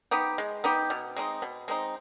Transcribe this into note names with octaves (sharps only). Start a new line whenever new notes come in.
B3 D#4 G4
G#3
B3 D#4 G4
B2
G#3 C4 D#4
B2
G#3 C4 D#4